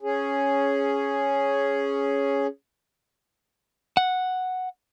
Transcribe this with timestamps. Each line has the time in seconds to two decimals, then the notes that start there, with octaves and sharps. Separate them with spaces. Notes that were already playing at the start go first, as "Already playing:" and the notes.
0.02 C#4 G#4
3.97 F#5